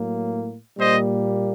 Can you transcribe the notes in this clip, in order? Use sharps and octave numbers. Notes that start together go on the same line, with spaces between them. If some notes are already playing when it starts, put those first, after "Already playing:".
Already playing: A2 F#3 A#3
A#2 G3 A#3 C5 D#5